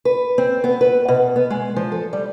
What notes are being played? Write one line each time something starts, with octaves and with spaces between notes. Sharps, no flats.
B4
C4
B3
B4
B2
B3
G#3
F3
A4
G3